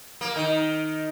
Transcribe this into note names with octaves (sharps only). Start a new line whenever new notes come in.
A#3
D#3